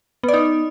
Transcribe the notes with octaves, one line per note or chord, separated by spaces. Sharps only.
B3
D5
D#4